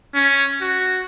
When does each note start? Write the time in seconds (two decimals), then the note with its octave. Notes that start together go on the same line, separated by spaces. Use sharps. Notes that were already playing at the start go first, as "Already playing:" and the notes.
0.15 C#4
0.61 F#4